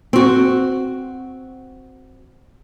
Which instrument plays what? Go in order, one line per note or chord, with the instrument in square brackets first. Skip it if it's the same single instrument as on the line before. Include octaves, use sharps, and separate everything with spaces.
[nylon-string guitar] C4 F#4